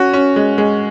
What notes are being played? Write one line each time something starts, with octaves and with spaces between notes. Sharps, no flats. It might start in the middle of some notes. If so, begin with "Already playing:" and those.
Already playing: C#4 F#4
C#4
G#3
G#3